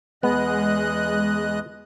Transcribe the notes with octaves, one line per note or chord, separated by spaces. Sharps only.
E2 G#3 B3 D#5 F#6